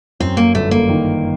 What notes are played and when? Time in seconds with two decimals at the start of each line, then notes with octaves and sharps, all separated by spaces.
0.20 F#2 C4
0.37 A#3
0.55 G1 A3
0.71 A#3
0.89 D#3